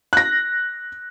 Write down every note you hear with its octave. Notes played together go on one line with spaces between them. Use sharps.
F#6 A#6